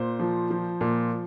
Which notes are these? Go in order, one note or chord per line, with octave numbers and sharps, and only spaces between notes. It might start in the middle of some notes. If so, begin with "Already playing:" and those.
Already playing: A#2 C5
F3
F3
A#2